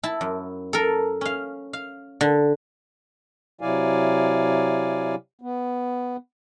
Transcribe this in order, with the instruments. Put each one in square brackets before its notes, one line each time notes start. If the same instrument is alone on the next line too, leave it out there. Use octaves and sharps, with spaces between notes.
[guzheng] E4 A5
F#2
A4 A#4
C#4 F5
F5
D3
[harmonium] C3 F#3 E4 D5 F5 G#5
B3